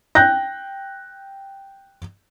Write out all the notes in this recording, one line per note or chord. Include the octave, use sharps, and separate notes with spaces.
G5 F#6 G6 A#6